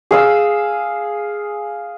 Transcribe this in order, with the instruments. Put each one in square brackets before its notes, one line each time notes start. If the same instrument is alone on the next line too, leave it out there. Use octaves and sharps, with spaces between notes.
[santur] G#4 F5 E6